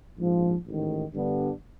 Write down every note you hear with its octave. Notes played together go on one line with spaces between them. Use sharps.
A#1 G#2 F3
A1 G#2 D#3
G2 D3 G3 B3 D4